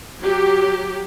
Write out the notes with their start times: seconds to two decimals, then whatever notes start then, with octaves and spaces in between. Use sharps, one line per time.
0.21 F#3 G4